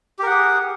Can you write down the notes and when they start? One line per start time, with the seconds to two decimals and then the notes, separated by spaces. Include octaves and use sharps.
0.19 G4
0.23 A#4
0.27 F#5
0.31 G#4